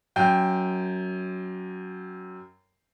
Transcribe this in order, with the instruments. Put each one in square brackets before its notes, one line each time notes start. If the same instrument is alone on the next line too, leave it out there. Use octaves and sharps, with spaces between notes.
[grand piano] F#2 G5 G6